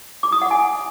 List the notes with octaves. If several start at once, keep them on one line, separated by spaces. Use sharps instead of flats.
D6
D#6
F#5
G#5